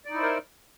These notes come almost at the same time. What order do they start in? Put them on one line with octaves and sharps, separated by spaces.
D5 D#4 E4 C5 A#4